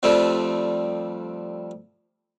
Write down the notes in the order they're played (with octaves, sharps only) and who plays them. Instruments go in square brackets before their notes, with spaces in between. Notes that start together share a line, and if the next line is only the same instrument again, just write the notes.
[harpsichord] F2 F3 G3 A3 C4